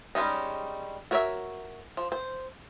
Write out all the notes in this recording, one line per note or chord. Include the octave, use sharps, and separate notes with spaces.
G3 G#3 B3 C#4 D#4
F#4 A#4 C#5 D5 E5
F3
C5